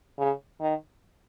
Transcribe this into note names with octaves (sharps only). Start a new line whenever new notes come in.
C#3
D#3